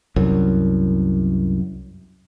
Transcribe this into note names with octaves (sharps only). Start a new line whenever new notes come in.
C2 F#2